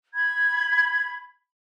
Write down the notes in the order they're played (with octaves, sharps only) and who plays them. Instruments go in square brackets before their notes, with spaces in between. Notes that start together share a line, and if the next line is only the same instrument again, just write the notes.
[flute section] B5 G#6